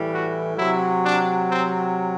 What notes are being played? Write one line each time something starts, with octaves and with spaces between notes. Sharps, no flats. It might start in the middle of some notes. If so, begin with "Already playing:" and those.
Already playing: A2 E3 G3
F#4
C3 F#3 E4
D4
C4